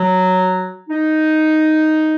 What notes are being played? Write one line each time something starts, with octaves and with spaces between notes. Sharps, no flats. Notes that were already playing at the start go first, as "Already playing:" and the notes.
Already playing: F#3
D#4